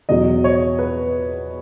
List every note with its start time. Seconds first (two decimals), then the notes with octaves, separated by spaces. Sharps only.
0.09 E2 B2 F#3 D#5
0.44 C#5
0.79 B4